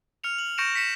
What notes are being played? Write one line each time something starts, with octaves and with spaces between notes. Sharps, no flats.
F6 C#7 F7
F#7
C#6 G6 A#6 C#7 D7 E7
B6 C#7 E7